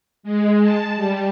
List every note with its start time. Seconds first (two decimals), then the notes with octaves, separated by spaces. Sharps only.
0.23 G#3
0.63 A5
0.96 G3